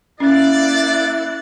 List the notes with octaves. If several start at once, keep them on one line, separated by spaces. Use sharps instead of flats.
A#3 C#4 E4 D5 F#6 A6